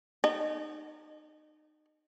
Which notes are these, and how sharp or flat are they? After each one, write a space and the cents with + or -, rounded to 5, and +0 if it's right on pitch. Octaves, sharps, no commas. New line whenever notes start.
D#4 -25